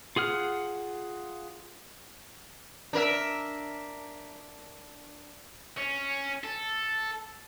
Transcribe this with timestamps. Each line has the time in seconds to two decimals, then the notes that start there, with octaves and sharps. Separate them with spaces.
0.16 F4 G#4 F#5 F6
2.93 D4 A#4 E5
5.77 C#4
6.44 A4